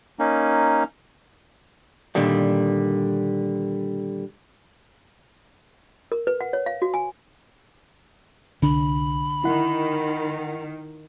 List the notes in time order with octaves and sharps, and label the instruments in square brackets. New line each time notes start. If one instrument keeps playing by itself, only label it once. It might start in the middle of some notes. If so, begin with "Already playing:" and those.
[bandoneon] A#3 C#4 D#4
[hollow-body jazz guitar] A#2 D3 D#3 G3
[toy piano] A#4
B4
F#5
C#5
F5
F#4
G#5
[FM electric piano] C2 [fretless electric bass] D3 D4 [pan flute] B5
[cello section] D#3 [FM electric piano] E4 F#5